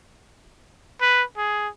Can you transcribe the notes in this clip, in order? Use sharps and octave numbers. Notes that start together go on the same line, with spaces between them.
B4
G#4